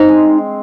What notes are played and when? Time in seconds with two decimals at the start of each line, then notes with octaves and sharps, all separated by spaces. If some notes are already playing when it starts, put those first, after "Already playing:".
Already playing: C4 D#4
0.09 G#3